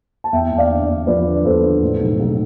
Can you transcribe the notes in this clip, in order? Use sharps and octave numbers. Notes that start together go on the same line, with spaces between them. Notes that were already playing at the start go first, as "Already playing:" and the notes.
A5
E2 E5 G5
E2
D5 F5
D3
E2
F3 B4 D5
D3
E2 A4 C5
D3
A2
B1
B1